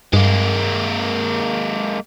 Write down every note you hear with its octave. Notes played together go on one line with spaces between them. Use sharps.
G2 G#3 A#3